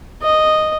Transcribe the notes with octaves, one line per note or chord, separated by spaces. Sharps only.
D#5